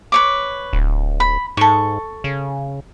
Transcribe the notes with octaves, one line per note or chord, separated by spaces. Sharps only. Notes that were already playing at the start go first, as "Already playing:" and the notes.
B4 C#5 D6
D1
B5
G#2 A4 C#6
C#3